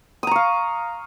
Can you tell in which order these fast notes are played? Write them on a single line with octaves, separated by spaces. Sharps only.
D#6 A#5 C#6 F5